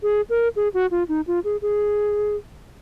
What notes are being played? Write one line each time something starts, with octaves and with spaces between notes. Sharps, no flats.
G#4
A#4
G#4
F#4
F4
D#4
F4
G#4
G#4